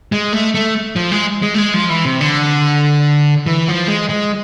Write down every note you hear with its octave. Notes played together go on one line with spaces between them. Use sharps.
G#3
A3
A3
F3
G#3
G#3
A3
G#3
F3
E3
C3
D3
E3
F3
G#3
G#3